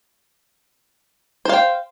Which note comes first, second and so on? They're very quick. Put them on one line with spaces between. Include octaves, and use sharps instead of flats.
C5 F5 G5